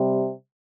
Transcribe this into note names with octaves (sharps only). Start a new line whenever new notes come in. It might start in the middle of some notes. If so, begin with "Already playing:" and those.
Already playing: C3 G3